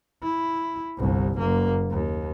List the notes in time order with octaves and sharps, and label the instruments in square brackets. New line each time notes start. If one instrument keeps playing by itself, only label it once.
[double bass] E4
G1 C2
F#1 A#3
D#2